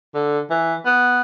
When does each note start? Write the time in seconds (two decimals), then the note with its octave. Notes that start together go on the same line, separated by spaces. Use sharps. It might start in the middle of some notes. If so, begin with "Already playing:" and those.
0.14 D3
0.50 E3
0.86 B3